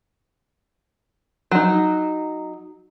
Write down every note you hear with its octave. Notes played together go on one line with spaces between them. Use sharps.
F#3 D#4